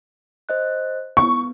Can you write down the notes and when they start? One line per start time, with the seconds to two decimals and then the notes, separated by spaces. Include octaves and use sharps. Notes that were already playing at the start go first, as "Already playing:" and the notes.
0.49 C5 D#5 F#6
1.17 B3 C#6